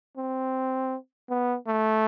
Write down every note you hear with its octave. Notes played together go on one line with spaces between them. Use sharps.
C4
B3
A3